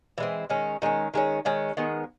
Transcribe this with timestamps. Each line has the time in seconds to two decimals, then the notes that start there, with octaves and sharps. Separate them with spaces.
0.18 E3 G#3 C4
0.50 D#3 G#3 C#4
0.82 D#3 G#3 C#4
1.14 D#3 G#3 C#4
1.45 D#3 G#3 C#4
1.77 D#3 G#3 B3